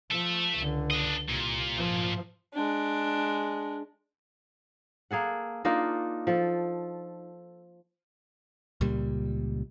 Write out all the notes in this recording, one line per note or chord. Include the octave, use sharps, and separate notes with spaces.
F3 A4 E5
C#2 D3
D4 D#5
C2 A#2
G#2 F3
G#3 D4
A#3 G#4 A4 F#5
A#3 D4 D#4 F4
F3 A4
C#2 A#2 G3